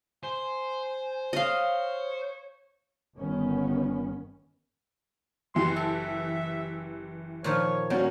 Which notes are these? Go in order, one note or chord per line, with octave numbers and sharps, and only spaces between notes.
C5 G#5
C#5 D#5 F5
G1 D#3 B3 C#4
F#1 E3 G4 C6
A4 E5
A#2 D#3 F3 C#5
G3 A#3 C#4 F#4